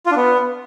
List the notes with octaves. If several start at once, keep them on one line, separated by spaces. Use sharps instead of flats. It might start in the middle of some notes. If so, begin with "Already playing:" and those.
F4
D4
B3